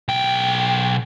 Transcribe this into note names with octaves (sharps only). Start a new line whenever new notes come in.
B1 G5